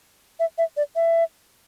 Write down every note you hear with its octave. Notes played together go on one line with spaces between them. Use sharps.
E5
E5
D5
E5